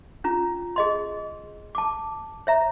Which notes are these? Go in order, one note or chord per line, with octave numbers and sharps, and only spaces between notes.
C#4 F4 A#5
G#4 D#5 C6
A5 D6
C#5 E5 A#5